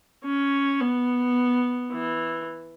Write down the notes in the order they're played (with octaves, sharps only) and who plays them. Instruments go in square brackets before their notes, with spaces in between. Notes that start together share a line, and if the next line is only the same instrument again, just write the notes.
[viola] C#4
B3
E3